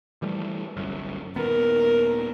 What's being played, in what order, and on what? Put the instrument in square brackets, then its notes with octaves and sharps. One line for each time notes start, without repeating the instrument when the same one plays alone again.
[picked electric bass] E3 G3 A3
G1 C2 F#2
[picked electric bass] D#1 D#2 B3 [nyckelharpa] A#4